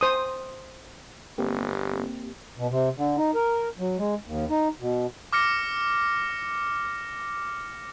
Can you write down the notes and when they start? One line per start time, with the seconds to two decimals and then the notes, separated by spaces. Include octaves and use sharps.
0.01 C5 D#6
1.38 G1 A#3 C4 G4
2.58 B2
2.71 C3
2.97 D3
3.18 D#4
3.34 A#4
3.79 F#3
3.98 G#3
4.25 D#2
4.50 D#4
4.80 B2
5.33 D6 F6 A#6 C#7